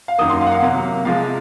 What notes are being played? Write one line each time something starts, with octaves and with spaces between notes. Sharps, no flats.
F5
F#2 D#3 F#3 A#3 D#6
C6
F5
F#5
F5
C3 F#3 A#3
C3 F3 G#3 F5